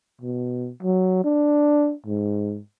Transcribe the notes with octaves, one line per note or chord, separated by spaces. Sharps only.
B2
F#3
D4
G#2